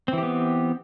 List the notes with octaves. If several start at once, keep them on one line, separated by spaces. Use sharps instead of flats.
E3 B3 C4 G4